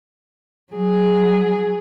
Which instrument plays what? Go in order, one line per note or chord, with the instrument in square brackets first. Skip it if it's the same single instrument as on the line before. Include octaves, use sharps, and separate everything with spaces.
[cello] F#3 G#4